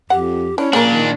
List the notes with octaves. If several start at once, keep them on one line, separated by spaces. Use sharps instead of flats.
F2 G4 F#5
C#4 D4 E4
A#2 C#3 A#3 D4 A#4
D#3